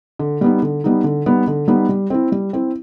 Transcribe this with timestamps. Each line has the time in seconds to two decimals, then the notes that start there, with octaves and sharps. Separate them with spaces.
0.19 D3
0.41 G3 B3 D#4
0.62 D3
0.84 G3 B3 D#4
1.04 D3
1.26 G3 B3 D#4
1.48 D3
1.68 G3 B3 D#4
1.89 G3
2.10 C4 E4
2.32 G3
2.53 C4 E4